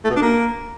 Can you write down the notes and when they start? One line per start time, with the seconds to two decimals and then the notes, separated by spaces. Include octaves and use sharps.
0.04 A3
0.10 B2
0.16 D4
0.22 A#3